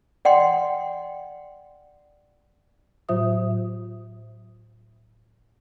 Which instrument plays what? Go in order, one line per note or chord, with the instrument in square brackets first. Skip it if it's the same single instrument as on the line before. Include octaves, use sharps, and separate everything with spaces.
[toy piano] D5 F#5 G5 C6
[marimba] A2 F#3 F4 C5 E5 D#6